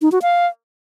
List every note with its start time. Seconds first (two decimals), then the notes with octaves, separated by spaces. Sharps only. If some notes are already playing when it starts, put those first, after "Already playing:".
0.02 D#4
0.12 F#4
0.22 F5